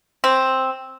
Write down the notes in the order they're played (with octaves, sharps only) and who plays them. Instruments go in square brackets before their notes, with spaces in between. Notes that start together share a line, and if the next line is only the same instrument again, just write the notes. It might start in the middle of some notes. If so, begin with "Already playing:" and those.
[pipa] C4